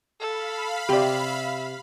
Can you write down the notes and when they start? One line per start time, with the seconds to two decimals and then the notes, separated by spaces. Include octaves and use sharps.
0.20 A4 F5 B5
0.89 C3 G4 D5 E5